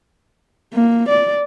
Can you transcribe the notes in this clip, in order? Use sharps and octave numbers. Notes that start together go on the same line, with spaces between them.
A#3
D5